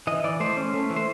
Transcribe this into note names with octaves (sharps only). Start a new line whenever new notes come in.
E3 D#5
E3 D5
A3 C5
C#4
A3
E3
C5